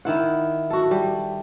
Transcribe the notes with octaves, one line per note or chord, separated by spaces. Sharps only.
D#3 E4 F#5
F#4 A4
G3